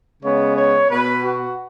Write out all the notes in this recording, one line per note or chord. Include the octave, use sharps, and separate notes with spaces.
C#3 G#3 B3 C#5
C#5
B2 B3 B4
F#4